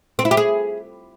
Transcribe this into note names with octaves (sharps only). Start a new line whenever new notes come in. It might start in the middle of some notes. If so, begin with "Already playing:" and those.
C4
E4
G4
G#4